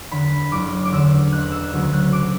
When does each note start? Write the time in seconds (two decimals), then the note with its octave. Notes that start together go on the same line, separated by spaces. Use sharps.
0.12 E2 D3 B5
0.51 F#1 D6
0.85 D6
0.92 E2 D3 E6
1.32 E1 F#6
1.52 E6
1.72 D2 C#3 F#3 A3
1.93 F#6
2.12 E1 D6